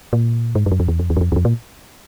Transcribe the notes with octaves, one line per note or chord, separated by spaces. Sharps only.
A#2
G#2
G2
F#2
F2
E2
F2
E2
F#2
F2
E2
F2
A#2